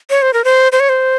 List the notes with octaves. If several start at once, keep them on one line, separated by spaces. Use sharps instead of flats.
C#5
C5
A#4
C5
C5
C#5
C5